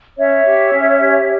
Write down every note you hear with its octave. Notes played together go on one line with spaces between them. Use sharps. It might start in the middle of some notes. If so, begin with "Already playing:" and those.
C#4 C#5 E5
G4
C#4
G4